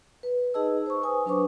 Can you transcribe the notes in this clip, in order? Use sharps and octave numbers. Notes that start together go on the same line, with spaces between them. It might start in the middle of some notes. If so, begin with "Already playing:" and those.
B4
D#4 G#4 B4 D#5 A5 E6
C5 C#6
B4 G#5 D#6
F#3 D4 B4 C5 C#6 D6